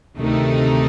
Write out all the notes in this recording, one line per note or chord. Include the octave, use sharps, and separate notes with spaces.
D2 C3 D#3 A3 D#4